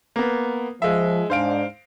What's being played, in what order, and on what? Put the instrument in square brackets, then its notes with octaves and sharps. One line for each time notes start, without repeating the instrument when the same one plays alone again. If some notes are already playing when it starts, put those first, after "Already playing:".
[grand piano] A#3 B3
[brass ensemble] F3 [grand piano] G#3 E5
[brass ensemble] G#2 D4 [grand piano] C5 F5 D7